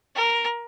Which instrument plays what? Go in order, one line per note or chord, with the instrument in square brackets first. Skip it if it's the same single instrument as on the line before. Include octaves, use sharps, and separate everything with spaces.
[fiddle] A#4